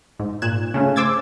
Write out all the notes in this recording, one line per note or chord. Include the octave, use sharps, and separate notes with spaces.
G#2
A#2 F#6 G#6 E7
C#3 A3 C#4
C5 D6 E6 G#6 A6